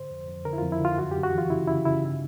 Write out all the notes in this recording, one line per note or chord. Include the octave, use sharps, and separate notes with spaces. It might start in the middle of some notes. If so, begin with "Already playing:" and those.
Already playing: G#2 D3 C5
F2
F2
D3 A#4
E4
F2 F4
E4
D3 F4
F#2 F#4
F#2 G4
F#4
E3
F4
C#3 E4
C#3 E4
C#3 E4
G2 D#4